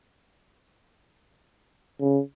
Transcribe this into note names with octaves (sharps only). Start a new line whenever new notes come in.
C#3